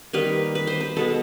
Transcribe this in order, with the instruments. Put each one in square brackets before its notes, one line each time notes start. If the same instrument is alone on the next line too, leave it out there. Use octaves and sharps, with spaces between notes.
[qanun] D#3 G3 A#3 B4
B4
C5
B4
B2 G#3 B3 A4